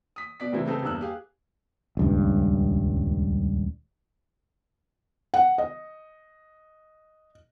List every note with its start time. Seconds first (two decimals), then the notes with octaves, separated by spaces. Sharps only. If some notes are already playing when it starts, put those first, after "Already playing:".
0.16 D#6 B6
0.40 B2 D5 B6
0.52 A2 C3 E3 C4 E4
0.66 C#3 A3 C4 D#4 A4 B4
0.82 E2 G2 A#3 D#4 E6 F#6
1.01 G4 G#4 F5
1.97 D#1 C#2 G2
5.34 F#5
5.58 D#5